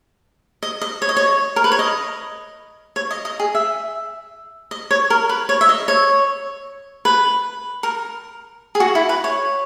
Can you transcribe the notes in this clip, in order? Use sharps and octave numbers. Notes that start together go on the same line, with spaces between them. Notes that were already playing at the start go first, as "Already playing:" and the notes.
D#5
D#5
C#5
D#5
C#5
A#4
B4
C#5
D#5
C#5
D#5
D#5
G#4
E5
D#5
C#5
A#4
B4
C#5
E5
D#5
C#5
B4
A#4
G#4
F#4
E4
B4
C#5